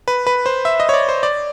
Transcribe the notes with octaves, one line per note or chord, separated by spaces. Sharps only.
B4
B4
C5
E5
D#5
C#5
D5
C5
D5